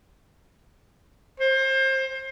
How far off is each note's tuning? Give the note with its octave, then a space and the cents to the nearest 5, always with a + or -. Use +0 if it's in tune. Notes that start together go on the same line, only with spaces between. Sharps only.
C5 +25